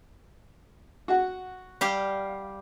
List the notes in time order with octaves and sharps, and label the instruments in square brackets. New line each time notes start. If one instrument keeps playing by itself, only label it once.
[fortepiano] F#4 F#5
[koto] G3 G4 F5